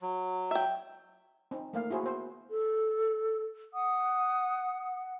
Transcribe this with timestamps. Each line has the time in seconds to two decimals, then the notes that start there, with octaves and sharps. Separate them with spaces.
0.02 F#3
0.51 E5 G5
1.51 C4 D#4
1.73 A3 A#3 F5
1.90 E4 F#4 G#4 C5
2.03 B3 C5
2.51 A4
3.74 F#5 D#6